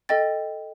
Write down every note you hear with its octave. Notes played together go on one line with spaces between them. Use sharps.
A4 D#5 G5 A6